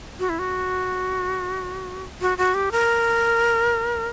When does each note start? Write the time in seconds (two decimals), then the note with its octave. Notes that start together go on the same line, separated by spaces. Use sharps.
0.19 F#4
0.29 E4
0.39 F#4
2.21 F#4
2.38 F#4
2.54 G4
2.72 A#4